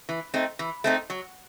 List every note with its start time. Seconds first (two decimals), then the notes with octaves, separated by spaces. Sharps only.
0.09 E3
0.34 A3 C4 D#4
0.59 E3
0.84 A3 C4 D#4
1.10 F#3